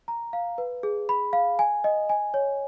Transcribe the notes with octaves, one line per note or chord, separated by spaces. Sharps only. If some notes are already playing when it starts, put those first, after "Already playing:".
A#5
F5
B4
G#4
B5
F5
G#5
D#5
G#5
C#5